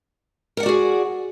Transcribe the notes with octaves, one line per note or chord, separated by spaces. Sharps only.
F#4 G#4 A#4 D5 F#5